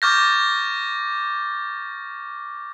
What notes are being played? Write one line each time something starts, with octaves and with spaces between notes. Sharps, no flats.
C#6 D6 F6 G6 A6 A#6